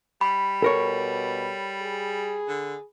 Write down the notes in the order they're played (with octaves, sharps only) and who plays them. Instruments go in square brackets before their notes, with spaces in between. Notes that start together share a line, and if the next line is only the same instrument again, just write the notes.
[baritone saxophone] G3 [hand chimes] B5
[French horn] B2 [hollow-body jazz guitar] A4 A#4 C#5
[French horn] G#4
[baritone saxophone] D3